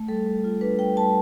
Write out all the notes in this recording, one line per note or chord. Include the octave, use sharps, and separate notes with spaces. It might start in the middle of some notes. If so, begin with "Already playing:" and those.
Already playing: A3
G3 A4
G3
F4
D4 B4
G3 G5
G3 A5